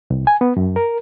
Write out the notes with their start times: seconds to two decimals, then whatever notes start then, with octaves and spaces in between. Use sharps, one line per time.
0.10 C2
0.27 G#5
0.41 B3
0.57 F#2
0.76 A#4